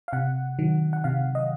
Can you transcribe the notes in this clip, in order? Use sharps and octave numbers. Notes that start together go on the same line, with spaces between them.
F5
C3 F#5
D#3 F#3
F#5
C3 F5
D#5